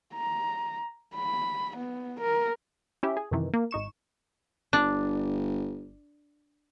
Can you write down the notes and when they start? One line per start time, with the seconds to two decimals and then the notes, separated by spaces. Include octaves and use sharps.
0.14 A#5
1.15 B5
1.78 B3
2.21 A#4
3.03 C#4 E4 G4 E5
3.17 G#4
3.31 F#2 C3 D#3 E3
3.53 A#3
3.71 G#1 D#4 C#6 E7
4.73 G1 D4